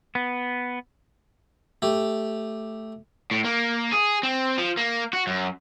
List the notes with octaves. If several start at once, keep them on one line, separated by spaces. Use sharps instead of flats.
B3
A3 G4
A2
A#3
G#4
C4
F3
A#3
F#4
F#2